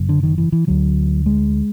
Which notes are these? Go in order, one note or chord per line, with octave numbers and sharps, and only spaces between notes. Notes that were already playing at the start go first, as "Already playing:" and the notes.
Already playing: F#1 F#2
D3
D#3
E3
E3
D2 D3 F#3
G#3